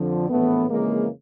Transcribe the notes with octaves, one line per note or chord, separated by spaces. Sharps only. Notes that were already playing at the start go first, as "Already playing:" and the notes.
Already playing: F2 D3 F3
A#1 A2 E3 A3 B3
F2 C#3 E3 G#3 A#3